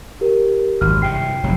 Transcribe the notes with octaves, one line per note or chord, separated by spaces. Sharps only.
G4 A#4
G#1 F#2 F6
G2 C3 G5 C7
F1 C3 F#3